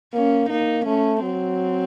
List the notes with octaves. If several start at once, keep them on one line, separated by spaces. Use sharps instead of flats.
A#3 C#4
A#3 D#4
A3 C#4
F#3 C4